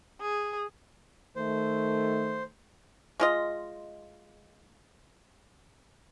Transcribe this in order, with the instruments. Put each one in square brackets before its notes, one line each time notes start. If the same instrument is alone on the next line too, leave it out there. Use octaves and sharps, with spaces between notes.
[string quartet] G#4
[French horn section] D#3 A3 [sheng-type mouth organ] C5
[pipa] G#3 F4 D#5